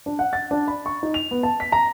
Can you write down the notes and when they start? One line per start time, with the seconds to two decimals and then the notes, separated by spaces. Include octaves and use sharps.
0.06 D4
0.19 F#5
0.33 A6
0.51 D4
0.68 B5
0.86 C#6
1.03 D#4
1.14 F7
1.31 B3
1.43 A5
1.60 B6
1.72 A#5